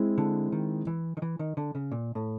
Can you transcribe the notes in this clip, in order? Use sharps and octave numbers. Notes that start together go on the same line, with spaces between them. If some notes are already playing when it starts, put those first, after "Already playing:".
Already playing: G#3 C4 E4
D3
D#3
E3
D#3
E3
D#3
D3
C#3
A#2
A2